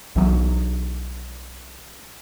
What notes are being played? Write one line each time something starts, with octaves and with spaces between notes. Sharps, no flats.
B1 E3 F#3 B3